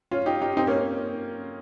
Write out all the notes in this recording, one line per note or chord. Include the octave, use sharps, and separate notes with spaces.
C#4 F4
D#4 G4
D#4 G4
C4 D#4
A#3 C#4